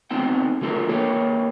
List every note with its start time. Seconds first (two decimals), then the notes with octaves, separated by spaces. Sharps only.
0.11 D2 B3 C4 D#4 G5
0.61 D3 A3 F4 A4 A#4
0.89 A#3 G4 B4 C#5